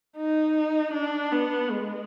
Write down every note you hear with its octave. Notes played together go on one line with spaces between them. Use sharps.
D#4
D4
B3
G#3